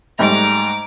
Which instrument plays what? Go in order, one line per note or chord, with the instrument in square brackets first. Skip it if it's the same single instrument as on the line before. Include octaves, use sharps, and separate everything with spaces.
[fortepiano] G#2 G3 A3 [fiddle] A#5 D6